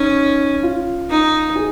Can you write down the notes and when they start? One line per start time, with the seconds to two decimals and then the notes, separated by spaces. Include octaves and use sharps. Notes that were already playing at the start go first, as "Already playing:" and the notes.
Already playing: C#4 D#4
0.63 F4
1.10 D#4
1.56 G#4